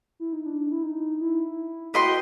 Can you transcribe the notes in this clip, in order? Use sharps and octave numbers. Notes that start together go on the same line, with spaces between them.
E4
D#4
D4
E4
D#4
E4
F#4 B4 D#5 G5 C6